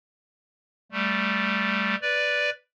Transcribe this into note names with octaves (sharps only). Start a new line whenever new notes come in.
G3 A3
B4 D5